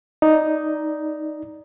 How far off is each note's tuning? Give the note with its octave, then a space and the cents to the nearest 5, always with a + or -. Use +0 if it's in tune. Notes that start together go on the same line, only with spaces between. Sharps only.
D#4 +0 D5 +0